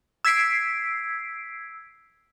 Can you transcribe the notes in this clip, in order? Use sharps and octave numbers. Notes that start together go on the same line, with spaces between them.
E6 G#6 B6 C7 D7